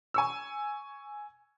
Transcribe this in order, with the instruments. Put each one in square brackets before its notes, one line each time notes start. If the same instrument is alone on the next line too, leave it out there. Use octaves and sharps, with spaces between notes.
[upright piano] G#5 C#6 E6